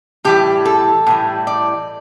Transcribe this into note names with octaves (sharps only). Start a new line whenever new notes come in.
A2 E3 G3 G4
A4
A2 E3 G3
D5